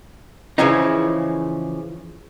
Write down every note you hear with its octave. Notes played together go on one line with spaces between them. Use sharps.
C#3 E3 F3 C#4 D#4